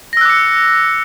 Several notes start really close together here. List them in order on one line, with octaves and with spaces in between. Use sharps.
A#6 E6 F#6 D6 C#7